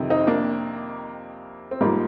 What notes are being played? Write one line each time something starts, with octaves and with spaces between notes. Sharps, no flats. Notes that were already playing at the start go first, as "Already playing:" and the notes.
Already playing: F2 C3 D#3
C4 D#4
A#3 D4
C4
G#2 F3 G3 A#3